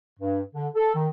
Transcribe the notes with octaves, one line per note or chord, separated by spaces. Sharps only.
G2
D3
A4
D#3